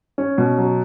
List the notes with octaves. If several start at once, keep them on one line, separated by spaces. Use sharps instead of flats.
C#4
B2
F#3